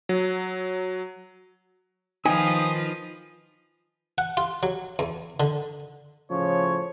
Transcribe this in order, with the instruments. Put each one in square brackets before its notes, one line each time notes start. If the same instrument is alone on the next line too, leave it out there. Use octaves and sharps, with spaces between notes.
[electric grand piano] F#3
[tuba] D#3 [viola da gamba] F3 F4 B4 [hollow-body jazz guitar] D#4 G5 G#5 [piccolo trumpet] D#6
[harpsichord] F#5
F4
F#3
E2
D3
[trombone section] A2 C#3 F3 [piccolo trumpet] C#5